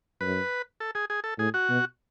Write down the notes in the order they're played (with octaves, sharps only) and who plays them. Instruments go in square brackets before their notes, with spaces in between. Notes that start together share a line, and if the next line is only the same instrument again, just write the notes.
[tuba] F#2 [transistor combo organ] B4
[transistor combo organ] A4
G#4
G#4
A4
[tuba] A2 [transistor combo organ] G#4
[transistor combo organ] F#4
[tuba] B2